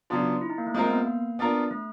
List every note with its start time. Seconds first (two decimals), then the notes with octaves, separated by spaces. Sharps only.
0.10 C#3 F#3 B3 D4 F4
0.41 E4
0.50 D#4
0.58 A#3
0.67 A3
0.74 G#3 A#3 C4 F4 A#4
0.90 B3
1.06 A#3
1.39 B3 D4 F4 A#4
1.71 A3